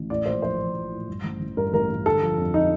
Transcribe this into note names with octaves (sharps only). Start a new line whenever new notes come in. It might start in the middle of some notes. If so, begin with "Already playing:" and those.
Already playing: A1
A2 D5
A#1 C5
F3 C5
F3
F3
A2
G2
A1
A1
G2 A#4
A1 A#4
G2
D3 A4
F3
F2
F3 D#4